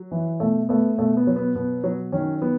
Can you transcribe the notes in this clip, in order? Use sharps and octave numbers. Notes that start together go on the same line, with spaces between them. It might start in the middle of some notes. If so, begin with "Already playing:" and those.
Already playing: F#3
E3
B2 A3
A3 B3
B2 A3
B3
F#3
B3
B2 B3
F#3
D#3 C#4
F#3 B3